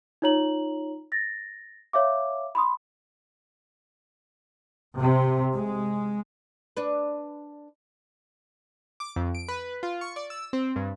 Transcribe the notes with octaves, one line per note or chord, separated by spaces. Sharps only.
D#4 F4 C#5 A#5 F#7
A6 A#6
C#5 E5 F5 D6
B5 C6 D#6
C3
G#3
D4 B4
D6
F2
D7
B4
F4
C#6
D5
E6
C4
G2